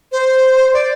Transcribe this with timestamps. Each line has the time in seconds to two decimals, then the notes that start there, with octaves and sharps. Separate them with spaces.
0.12 C5
0.73 D5